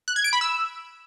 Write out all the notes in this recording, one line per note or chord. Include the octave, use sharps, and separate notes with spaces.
F#6
G#6
D7
B5
E6